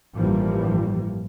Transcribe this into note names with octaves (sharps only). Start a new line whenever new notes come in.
A1 G2 E3 F3 G3 A#3